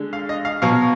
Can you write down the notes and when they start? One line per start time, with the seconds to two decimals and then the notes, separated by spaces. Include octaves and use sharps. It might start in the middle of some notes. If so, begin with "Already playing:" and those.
Already playing: D3 G#3
0.13 F5
0.29 D#5
0.45 F5
0.62 B2 F#3 F5